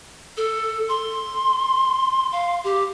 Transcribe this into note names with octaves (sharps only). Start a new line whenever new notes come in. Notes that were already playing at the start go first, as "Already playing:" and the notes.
A4
C6
F5
G4